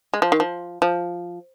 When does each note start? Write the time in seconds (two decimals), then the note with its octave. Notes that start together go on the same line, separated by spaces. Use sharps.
0.14 G#3
0.22 F3
0.32 D#3
0.40 F3
0.82 F3